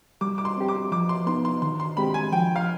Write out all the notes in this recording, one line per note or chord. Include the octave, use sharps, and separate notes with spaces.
G3 D6
D6
C6
C4 G4
D6
F3 D6
C6
B3 D#4 C6
C6
D#3 C6
C6
G#3 C4 G4 B5
G#5
F3 G5
F5